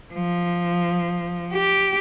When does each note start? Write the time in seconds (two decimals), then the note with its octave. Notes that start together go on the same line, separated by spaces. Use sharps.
0.14 F3
1.53 G4